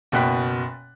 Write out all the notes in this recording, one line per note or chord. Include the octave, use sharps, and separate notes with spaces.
F#1 B2 F#4 G5 F#6 B6